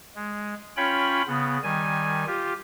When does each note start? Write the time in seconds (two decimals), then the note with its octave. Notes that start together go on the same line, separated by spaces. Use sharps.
0.16 G#3
0.77 C#4 F4 C#5 G5 B5
1.28 C#3 B3
1.63 D#3 G3 G#5
2.27 F4 G4